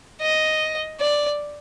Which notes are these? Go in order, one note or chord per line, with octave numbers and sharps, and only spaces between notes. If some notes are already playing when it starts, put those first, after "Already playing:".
D#5
D5